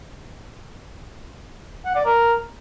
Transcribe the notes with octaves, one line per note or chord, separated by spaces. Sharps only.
F#5
D5
A#4